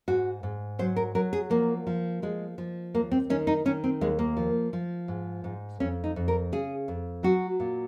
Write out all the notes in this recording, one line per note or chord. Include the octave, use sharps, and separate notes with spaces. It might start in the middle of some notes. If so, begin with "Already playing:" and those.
G#2 F#4
G#2
F#3 C5
A#4
F#3 A#4
G#4
F3 A#3
F3
F3 G#3
F3
D#2 A#3
C4
D#3 C#4
D#4
D#3 C#4
C4
D#2 G#3
A#3
F3
F3
G#2
G#2
F2 C#4
D#4
F2
A#4
C#3 G#4
F2
F#3 F#4
A#2